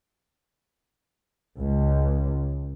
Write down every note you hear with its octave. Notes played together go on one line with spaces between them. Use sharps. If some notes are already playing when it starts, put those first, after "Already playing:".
C#2